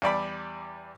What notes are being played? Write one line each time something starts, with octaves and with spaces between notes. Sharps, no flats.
E2 G3 D5 B5